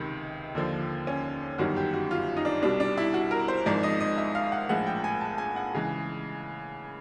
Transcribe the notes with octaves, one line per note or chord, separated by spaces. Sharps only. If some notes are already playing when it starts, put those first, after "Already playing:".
Already playing: C#2 C3 D#3
D#2 D3 F3
C#4
G1 F#2 D#3 G3 F#4
G4
F#4
F4
D#4
D4
C2 B2 G3 D4
D4
E4
F#4
A#4
C5
G#1 G#2 F3 D5
D#5
D#5
E5
F5
F#5
A#1 A2 F3 G#3 F#5
G5
G#5
A5
G#5
F#5
C#3 E3 G#3